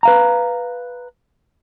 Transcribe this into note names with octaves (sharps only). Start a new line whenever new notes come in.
B4 F5 A#5